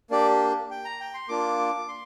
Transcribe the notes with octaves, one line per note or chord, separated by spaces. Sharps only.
A#3 D4 G4 D5
G5
A#5
G5
C6
A#3 D4 F4 D6
C6